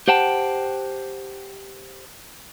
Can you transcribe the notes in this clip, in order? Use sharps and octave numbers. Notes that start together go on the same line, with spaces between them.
G4 C5 F#5 G5 A5